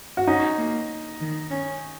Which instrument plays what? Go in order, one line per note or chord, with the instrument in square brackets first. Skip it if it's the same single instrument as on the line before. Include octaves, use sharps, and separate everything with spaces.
[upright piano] F#4
[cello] C#4 [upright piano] D#4
[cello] A#3
D#3
C#4